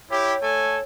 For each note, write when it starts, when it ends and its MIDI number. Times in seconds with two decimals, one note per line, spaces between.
0.10 0.34 64
0.10 0.34 67
0.10 0.83 73
0.41 0.78 57
0.41 0.78 69
0.41 0.78 80